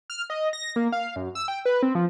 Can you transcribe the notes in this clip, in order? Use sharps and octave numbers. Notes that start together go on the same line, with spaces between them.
F6
D#5
A#6
A#3
F5
F#2
E6
G5
B4
C4
F3